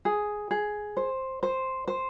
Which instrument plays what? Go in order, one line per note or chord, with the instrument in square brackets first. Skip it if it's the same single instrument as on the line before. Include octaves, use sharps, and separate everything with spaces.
[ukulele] G#4
G#4
C5
C5
C5